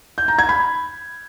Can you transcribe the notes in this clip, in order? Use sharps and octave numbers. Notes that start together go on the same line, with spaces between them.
G6
A#5
G#6
B5